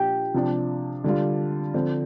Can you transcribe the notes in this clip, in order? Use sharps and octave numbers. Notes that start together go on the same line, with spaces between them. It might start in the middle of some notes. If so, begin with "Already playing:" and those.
Already playing: A#2 F3 D4 G4
C3 F3 D4
D3 G3 D4 F4
D3 F3 C4